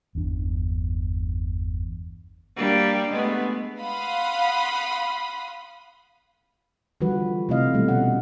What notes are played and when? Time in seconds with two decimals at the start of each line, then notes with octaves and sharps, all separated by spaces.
0.15 G1 E2 D4
2.56 G3 A#3 D4
3.11 G#3 A3 B3
3.80 F5 F#5 B5 C6 D#6
7.01 D3 E3 F3 G3 F#4 B4
7.49 C3 E3 A3 E4 D#5 F5
7.74 B2 D3 G3 A3
7.88 C#4 F#5